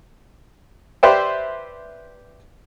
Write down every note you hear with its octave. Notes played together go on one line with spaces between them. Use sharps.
G4 B4 C5 D5 E5 G5